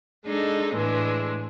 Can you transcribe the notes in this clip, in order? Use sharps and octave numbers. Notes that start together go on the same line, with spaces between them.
G#3 D4 D#4 A4
A2 E3 G#3 D4